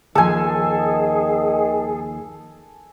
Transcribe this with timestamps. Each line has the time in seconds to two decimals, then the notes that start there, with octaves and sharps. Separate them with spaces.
0.15 D#2 D#3 F3 G#4 A4 G#5